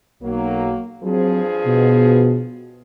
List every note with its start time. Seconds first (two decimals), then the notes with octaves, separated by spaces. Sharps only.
0.22 B1 F#3 A#3
1.02 G2 F3 F#3 C4 G#4
1.66 B2